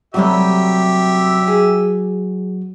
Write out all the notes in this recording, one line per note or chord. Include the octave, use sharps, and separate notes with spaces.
C3 F#3 G3 A3 F#4 G4 E5
G#4